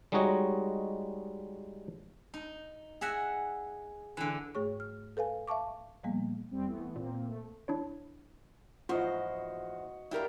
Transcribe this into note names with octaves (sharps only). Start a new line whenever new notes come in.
G3 G#3 D#4 F#4 C#5 D#5
D#4
G#4 D#5 E5 F#5
D3 E3
G#2 A3 G#4 C#5 C#6
F6
A4 B4 F5 G#5
E5 F5 A5 C#6 D6
A#2 F3 G3 A#3 B3
E2 G3 C4
E3 A3 B3
A#2 A#3 C4
A3
D4 E4 C#5
E2 G#2 F3 F4 F#4 C5 D#5
D4 E4 F4 G4 A#4